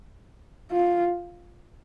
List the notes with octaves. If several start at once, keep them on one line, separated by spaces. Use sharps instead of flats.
F4